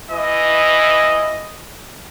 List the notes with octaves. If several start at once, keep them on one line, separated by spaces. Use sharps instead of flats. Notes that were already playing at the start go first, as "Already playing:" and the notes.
E3 D#5